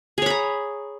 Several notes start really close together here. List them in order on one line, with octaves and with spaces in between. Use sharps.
G#4 C#5 B5 A#5